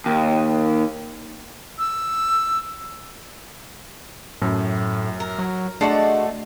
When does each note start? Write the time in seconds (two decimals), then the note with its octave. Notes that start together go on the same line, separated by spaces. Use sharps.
0.06 D#2
1.79 E6
4.42 F#2 A2
5.20 A#4
5.39 F#3
5.81 G#3 A3 D4 F#4 D5 A5